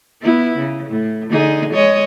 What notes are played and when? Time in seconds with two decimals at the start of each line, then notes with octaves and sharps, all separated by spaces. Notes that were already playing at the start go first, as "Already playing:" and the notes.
0.22 B3 E4
0.58 C#3
0.89 A2
1.30 D3 D#4 G#4
1.73 G#3 C#5 D#5